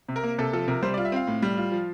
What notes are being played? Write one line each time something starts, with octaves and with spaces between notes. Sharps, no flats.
C3
A#4
A#3
C3 A4
F3 A4
C3 A#4
G3 C5
D5
F4
E5
C4 F5
A2
G3
F4
F3